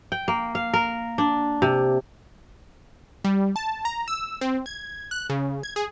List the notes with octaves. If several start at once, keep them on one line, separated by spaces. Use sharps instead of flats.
G5
A#3
F5
A#4
D4
C3
G3
A5
A#5
E6
C4
G#6
F#6
C#3
G#6
G#4